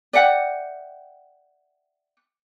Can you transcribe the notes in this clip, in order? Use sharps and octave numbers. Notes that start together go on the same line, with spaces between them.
D5 E5 F#5 G5